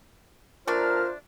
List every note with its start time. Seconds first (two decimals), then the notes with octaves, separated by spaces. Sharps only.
0.68 A#2 A3 D4 F4 C5 A5 A#5 F6